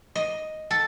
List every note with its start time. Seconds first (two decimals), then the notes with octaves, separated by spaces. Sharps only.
0.15 D#5
0.71 A4